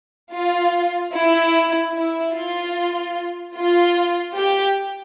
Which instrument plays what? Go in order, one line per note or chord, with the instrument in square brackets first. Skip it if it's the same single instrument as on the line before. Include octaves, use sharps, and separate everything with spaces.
[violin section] F4
E4
E4
F4
F4
G4